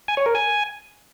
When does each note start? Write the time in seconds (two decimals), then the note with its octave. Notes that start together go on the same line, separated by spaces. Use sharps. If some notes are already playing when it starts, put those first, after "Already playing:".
0.08 G#5
0.17 C#5
0.26 A#4
0.35 G#5